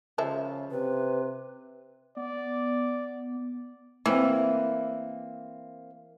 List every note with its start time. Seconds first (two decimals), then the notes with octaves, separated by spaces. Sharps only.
0.18 C#3 F3 G#3 E5
0.71 C3 B4
2.17 B3 D5
4.06 E3 A#3 C4